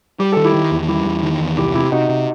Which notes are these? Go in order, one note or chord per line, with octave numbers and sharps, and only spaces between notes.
G3 G4
D#3 A4
E4 G4
D#3
E2
G3 E4 G4
E2
D#3
E2
C2 E4 G4
C3 E4 G4
C3 D#4 F#4
C3